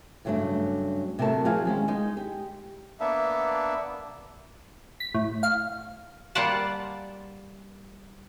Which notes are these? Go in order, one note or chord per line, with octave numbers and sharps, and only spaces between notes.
G2 C#3 F#3 A3 D4
C3 F#3 A3 A#4 A5
F3 F#3 C4 G#4 F5 G#5
D#3 G#3 C#4
G#3 D#4
G4
A#3 B3 D4 E5
B6
A2
F5
G3 A#3 F4 D5 F#5 A5